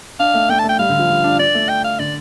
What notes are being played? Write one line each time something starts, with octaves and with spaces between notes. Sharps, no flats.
D4 F5
A3
A3 G5
A5
A3 G5
G3 F5
D3
F3
G3
D4
D4 D5
A3
G5
F5
D3 D5